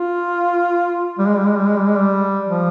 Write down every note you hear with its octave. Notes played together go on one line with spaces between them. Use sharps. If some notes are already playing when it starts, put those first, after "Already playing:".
Already playing: F4
G3
G#3
G3
G#3
G3
G#3
G3
G#3
G3
F3